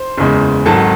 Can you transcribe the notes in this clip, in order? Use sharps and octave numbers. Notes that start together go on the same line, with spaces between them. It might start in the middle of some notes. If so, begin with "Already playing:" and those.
Already playing: C5 C6
F#1 E2 C#3 G#3
G#1 G#2 D#3 F#3 A4 A5